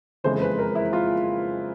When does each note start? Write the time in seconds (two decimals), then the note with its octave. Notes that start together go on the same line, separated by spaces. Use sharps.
0.24 F#1 F2 C#3 E3 G#3 C5
0.41 B4
0.59 A#4
0.75 E4
0.93 F4